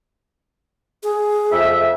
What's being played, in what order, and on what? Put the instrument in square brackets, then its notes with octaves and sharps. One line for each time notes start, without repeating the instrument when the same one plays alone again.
[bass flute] G#4
[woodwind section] F2 E5